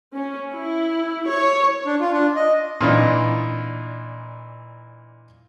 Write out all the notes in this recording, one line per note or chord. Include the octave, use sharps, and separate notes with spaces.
C#4
E4
C#5
D4
F4
D4
D#5
A#2 E3 D4 D#4